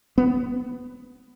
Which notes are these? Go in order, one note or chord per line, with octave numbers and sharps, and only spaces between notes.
B3